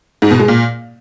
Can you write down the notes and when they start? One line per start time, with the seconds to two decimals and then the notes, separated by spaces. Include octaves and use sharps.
0.22 G#2
0.31 B2
0.39 G#3
0.48 A#2